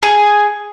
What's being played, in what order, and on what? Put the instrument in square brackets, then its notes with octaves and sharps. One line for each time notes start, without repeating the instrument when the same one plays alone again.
[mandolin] G#4